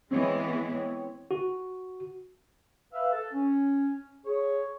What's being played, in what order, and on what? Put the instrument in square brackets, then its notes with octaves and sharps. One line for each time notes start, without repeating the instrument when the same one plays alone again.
[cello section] E3 G#3 B3 [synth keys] C4 C#5
[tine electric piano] F#4
[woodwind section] B4 E5 F5
A4
C#4
G#4 C#5